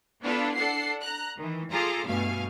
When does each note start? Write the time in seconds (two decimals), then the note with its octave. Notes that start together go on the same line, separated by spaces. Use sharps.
0.22 B3 D4 E4 F4 A4 B4
0.55 D4 A4 F#5 C7
1.02 A#5 F#6
1.37 D#3 E3
1.71 F4 G#4 A4 A#5 C6 D6
2.06 G2 B2 A3 F5 G#5